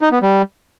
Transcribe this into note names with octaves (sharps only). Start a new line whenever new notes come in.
D#4
B3
G3